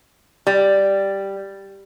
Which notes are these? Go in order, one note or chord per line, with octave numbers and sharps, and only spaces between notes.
G3